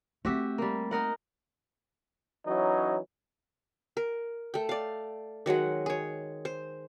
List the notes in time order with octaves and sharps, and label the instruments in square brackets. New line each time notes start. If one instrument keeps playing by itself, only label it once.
[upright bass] A3 C4 [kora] F#4 G4 E5
[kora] G3 A#3
D#4 A#4 F#5
[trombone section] E3 F#3 C#4 D#4
[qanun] A#4
A3 G5
D5 F5
D#3 F#3 G#3 F#5
G#4 C#5
C5